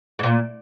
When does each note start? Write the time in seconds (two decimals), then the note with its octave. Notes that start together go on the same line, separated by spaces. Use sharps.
0.19 G#2
0.23 A#2